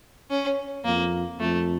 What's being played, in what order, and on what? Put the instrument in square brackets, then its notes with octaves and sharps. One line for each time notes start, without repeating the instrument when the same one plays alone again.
[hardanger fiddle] C#4
[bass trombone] F2 [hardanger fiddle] A#3
[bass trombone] F2 [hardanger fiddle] A3